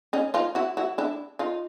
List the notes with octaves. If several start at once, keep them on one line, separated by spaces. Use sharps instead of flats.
C#4 D#4
D#4 F4
E4 F#4
E4 F#4
D4 E4
D#4 F4